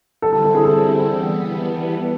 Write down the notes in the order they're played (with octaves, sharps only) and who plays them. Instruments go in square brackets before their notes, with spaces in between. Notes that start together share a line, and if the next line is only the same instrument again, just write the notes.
[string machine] D3 G3 C4 E4 [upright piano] A4
[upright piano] A4
A4
G#4
A4
[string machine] E3 G3 B3